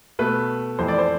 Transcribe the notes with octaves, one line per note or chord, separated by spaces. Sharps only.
B2 A3 B4
F2 E3 A3 C5
D5
C5